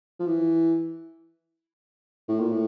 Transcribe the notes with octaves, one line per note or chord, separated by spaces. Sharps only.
F3
E3
A2
A#2
A2